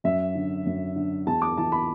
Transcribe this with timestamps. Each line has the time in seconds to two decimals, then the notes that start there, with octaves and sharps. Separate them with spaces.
0.04 F#2 E5
0.35 D3
0.66 F#2
0.96 D3
1.26 E2 A5
1.42 D6
1.57 E3 A5
1.72 B5